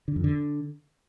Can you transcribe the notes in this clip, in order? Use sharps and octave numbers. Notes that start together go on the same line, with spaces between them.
D3
F2
D3